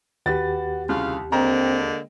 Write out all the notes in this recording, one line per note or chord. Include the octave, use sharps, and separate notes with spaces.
D#2 F#4 G4 B4 A6
C2 C#3 F4 F5
D3 G#3 A#3 C4 G5 A#5